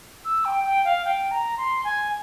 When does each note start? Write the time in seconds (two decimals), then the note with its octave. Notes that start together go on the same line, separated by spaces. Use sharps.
0.25 E6
0.45 G5
0.64 G5
0.85 F5
1.05 G5
1.31 A#5
1.58 C6
1.84 G#5